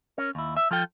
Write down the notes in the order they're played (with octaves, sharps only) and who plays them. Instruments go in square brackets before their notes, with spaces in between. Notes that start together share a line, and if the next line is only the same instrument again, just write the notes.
[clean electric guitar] C#4 A#4 C#5
D#2 E4
E5
F3 F4 A4 G5